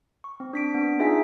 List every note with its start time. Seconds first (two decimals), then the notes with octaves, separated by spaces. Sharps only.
0.24 C#6
0.40 C4
0.53 D4 B6 D7
0.74 B3 D4
0.99 D#4 F4 G#4 E5 G#5 B6